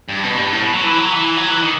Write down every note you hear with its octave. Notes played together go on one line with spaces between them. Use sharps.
G2
B2
G2
A2
B2
F#3
E3
F#3
E3
F#3
E3
D#3